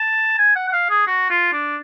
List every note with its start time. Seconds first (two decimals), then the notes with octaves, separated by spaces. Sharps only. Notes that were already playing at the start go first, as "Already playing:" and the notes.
Already playing: A5
0.38 G#5
0.55 F#5
0.68 F#5
0.73 F5
0.90 G#4
1.07 F#4
1.30 F4
1.53 D4